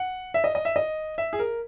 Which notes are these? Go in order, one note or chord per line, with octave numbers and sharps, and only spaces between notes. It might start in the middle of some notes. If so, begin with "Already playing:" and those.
Already playing: F#5
E5
D#5
D#5
E5
D#5
E5
G#4
A#4